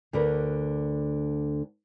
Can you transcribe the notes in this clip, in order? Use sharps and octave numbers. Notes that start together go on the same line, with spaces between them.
D2 D3 A#4 B4